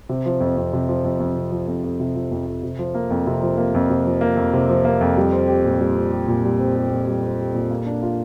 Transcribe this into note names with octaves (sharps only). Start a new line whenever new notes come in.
C3
F3
F2
F2
C3
F3
F2
F2
C3
F3
F2
F2
C3
F3
F2
F2
C3
F3
A#3
F2
C3
F3
A#3
F2
C3
F3
A#3
F2
C3
F3
A#3
F2
G3
C4
G4
A#2
G3
C4
G4
A#2
G3
C4
G4
A#2
G3
C4
G4
A#2
A#3
D4
F4